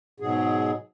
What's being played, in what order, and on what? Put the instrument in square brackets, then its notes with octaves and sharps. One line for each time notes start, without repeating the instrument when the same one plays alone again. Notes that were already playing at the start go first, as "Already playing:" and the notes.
[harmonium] G#2 B2 F#3 G#4